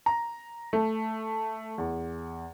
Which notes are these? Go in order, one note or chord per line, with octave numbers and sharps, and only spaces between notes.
A#5
A3
E2